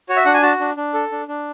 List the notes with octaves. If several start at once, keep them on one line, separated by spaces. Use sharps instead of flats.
F#4 C#5
E5
D4 F#5
G#5
F#4 A5
D4
D4
A4
D4
D4